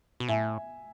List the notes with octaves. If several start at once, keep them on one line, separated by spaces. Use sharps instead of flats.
B2
A2 E5 G#5